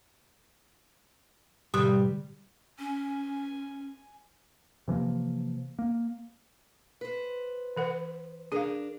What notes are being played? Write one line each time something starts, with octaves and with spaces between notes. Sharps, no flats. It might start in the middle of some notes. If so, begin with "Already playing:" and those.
G#2 B2 D3 G3
C#4 G#5
C3 E3 F3 A#3
A#3
B4 C5
E3 A#4 F#5
D4 G#4 A#4 F5